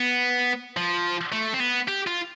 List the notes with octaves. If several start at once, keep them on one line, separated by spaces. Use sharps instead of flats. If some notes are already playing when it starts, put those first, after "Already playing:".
Already playing: B3
F3
A3
C4
B3
G4
F4